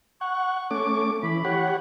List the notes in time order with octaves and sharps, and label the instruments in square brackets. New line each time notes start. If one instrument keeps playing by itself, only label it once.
[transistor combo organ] F#5 [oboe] C#6
[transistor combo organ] A3 C#4 D6
[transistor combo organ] E3 [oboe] B5
[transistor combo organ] G4 C#5 F#5